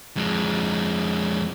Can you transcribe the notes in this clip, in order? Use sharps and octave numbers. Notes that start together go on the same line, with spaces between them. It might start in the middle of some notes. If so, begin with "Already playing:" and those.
F2 G#3